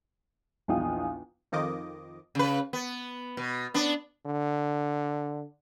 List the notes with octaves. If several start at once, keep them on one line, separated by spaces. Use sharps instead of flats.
A#1 E2 D#4 F5 G5 D#6
F2 D#3 F3 D#5 D6
C#3 B4
B3
B2
B3 D4
D3